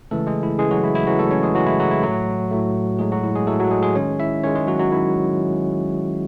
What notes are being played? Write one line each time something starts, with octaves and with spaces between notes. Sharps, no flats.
C#3 E3 G#3 A3 A4
G#3 G#4
E4
C#3 E3 G#3 G#4
F#3 F#4
E4
E4
C#3 E3 F#3 G#3 F#4
A3 A4
C#4 C#5
G#3 G#4
C#3 E3 F#3 G#3 F#4
E4
F#3 F#4
E4
A2 F#3 A3 F#4
A2 F#3 A3
A2 F#3 G#3 A3 G#4
F#3 F#4
E4
G#3 G#4
A2 F#3 A3 A4
F#3 F#4
G#3 G#4
G#3 G#4
D#3 G#3 C#4 C#5
E4 E5
D#3 G#3 C#4 C#5
G#3 G#4
F#3 F#4
F#3 F#4
D#3 E4